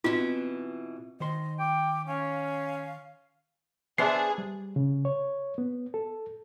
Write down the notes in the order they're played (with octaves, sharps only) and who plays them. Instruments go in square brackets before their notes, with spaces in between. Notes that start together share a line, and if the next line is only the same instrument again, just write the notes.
[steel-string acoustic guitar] B2 E3 [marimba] C4 [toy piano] F4
[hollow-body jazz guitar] D#3 C5 C6 [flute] D#5
[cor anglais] G5 [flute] D6
[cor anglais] C#4 [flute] F5
[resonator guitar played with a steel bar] B3 C5 E5 [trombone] D4 [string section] G#4 [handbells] C7
[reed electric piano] G3
C#3
C#5
B3
A4